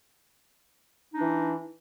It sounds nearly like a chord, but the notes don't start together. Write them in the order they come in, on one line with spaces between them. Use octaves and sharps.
D#4 D4 E3